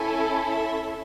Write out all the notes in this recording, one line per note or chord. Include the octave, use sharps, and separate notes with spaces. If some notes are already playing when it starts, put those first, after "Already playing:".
Already playing: C#4 E4 A4 G#5
E5